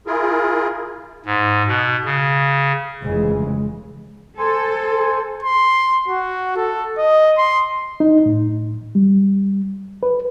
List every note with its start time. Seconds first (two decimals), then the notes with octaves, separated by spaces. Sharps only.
0.07 E4 F4 G#4 A#4
1.25 G#2
1.68 B2
2.05 C#3
3.01 F1 C#3 E3 G#3
4.39 A4 C5 G#5
5.43 C6
6.08 F#4
6.57 A4
6.98 D#5
7.37 C6
8.00 D#4
8.26 A2
8.95 G3
10.03 B4